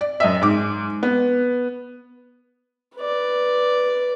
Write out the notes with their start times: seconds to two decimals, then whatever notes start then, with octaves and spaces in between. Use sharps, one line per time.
0.01 D5
0.20 F#2 D#5 E5
0.41 G#2 D6
1.03 B3
2.98 B4 D5